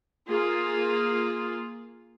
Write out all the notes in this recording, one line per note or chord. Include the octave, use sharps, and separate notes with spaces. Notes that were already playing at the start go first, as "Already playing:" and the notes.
A#3 F4 G#4